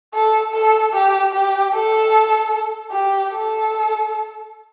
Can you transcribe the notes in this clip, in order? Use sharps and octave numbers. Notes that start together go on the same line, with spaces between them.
A4
A4
G4
G4
A4
G4
A4